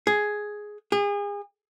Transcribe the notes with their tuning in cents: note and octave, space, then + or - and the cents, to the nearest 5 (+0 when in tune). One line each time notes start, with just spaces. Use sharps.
G#4 +5
G#4 -35